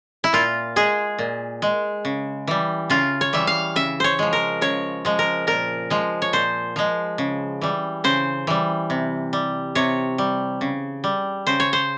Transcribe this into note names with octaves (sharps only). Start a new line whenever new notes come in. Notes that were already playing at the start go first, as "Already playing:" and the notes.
E4
A#2 F4
G#3 G#4
A#2
G#3
C#3
E3 G3
C#3 F4
C#5
E3 G3 E5
F5
C#3 E5
C5 C#5
F3 G#3
A#4
C#3 C#5
F3 G#3
A#4
A#2 A#4
F3 G#3
C#5
A#2 C5
F3 G#3
C#3
E3 G3
C#3 C5
E3 G3
C3
G3
C3 C#5
G3
C#3
G3
C#3 C5
C#5
C5